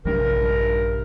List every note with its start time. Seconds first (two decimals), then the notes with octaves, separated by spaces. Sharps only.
0.05 A#1 G2 C3 G3 D4 A#4